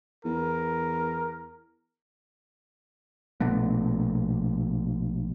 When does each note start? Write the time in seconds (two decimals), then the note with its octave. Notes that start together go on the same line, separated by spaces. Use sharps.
0.25 E2 A#4
3.40 A#1 B2 A3 B3